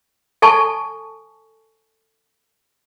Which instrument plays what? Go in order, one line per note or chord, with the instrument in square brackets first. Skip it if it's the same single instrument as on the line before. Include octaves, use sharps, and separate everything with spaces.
[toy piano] A4 G#5 A5 C#6